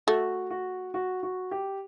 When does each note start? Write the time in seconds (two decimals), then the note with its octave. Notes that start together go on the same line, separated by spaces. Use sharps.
0.07 A3 F#4
0.50 F#4
0.94 F#4
1.23 F#4
1.51 G4